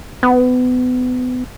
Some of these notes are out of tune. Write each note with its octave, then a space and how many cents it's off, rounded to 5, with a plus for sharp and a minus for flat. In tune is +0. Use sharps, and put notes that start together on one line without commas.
B3 +30